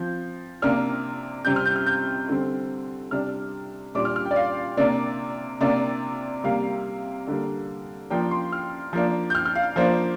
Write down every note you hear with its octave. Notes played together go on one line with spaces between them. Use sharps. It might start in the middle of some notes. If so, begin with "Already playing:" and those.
Already playing: F3 C4 G6
C3 A#3 D4 F6
C3 G3 C4 G6
F6
G6
F6
G6
D3 G3 C4
C3 G3 D4 F6
A#2 G3 D4 D6
F6
F6
G5
D5
F5
C3 A#3 D4 D5
C3 A#3 D4 D5
C3 G3 A#3 F5
D3 G3 A#3
F3 A#3 D4 G5
C6
F6
F3 A#3 D4
G6
F6
F6
F5
F3 A#3 D4 C5